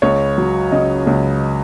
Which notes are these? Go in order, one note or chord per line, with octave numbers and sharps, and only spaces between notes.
C#2 C#5
F#3
C#3 D#5
C#2